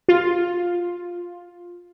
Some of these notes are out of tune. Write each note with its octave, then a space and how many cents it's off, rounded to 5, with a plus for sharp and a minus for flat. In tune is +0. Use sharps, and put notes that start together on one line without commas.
F4 +10